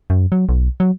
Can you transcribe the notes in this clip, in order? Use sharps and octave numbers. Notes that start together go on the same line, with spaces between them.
F#2
F#3
B1
F#3